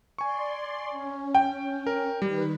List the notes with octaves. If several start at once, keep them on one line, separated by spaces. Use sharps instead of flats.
D5 G#5 C6 C#6
C#4
G5
A#4
D#3 G3 B4